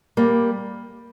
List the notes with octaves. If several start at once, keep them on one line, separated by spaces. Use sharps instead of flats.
G3 A#3